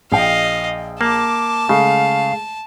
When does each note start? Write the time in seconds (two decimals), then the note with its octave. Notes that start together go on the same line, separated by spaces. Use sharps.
0.12 A#1 D#5 F5 G5
1.01 A#3 A5 D6
1.69 C#3 G#3 A3 F5